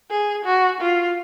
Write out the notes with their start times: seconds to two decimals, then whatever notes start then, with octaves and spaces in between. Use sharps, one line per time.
0.11 G#4
0.45 F#4
0.81 F4